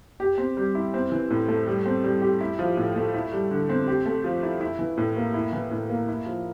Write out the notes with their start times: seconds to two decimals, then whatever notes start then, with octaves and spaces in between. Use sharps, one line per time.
0.20 G4
0.38 C4
0.57 G3
0.75 E4
0.94 C4
1.12 E3
1.30 A2
1.48 A3
1.67 G3
1.86 C4
2.04 G3
2.22 G4
2.41 E4
2.59 F3
2.77 A2
2.96 A3
3.14 E4
3.33 G3
3.51 D3
3.69 C4
3.88 G4
4.06 A3
4.24 F3
4.43 E4
4.61 E4
4.79 E3
4.97 A2
5.16 A#3
5.34 E4
5.53 E3
5.71 A2
5.90 A#3
6.09 E4
6.26 F3